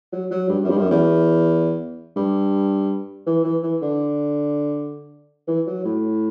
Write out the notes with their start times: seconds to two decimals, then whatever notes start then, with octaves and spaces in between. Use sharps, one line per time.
0.13 F#3
0.31 F#3
0.49 G2
0.64 F#2
0.70 G2
0.78 F#2
0.91 E2
2.16 G2
3.27 E3
3.44 E3
3.63 E3
3.82 D3
5.47 E3
5.67 F#3
5.85 A2